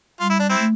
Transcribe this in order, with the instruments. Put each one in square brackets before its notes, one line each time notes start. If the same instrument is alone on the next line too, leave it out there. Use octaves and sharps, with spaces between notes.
[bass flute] G3 [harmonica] F4
[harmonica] E4
D4
C4 E4
[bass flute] A3